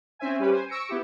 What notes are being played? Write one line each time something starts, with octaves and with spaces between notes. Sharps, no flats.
C4 C#4 C5 E5 G#5
G3 C#4 G4 B4
C5 G#5
C#6 E6 A#6 C#7 D7
B3 E4 G4